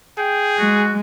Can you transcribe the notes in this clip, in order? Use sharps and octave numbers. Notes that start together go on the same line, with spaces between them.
G#4 G5
G#3 F#4